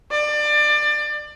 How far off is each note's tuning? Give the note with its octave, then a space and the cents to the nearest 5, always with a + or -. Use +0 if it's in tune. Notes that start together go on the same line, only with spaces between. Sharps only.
D5 +25